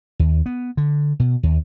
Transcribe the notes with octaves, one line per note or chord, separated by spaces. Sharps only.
D#2
B3
D3
B2
D#2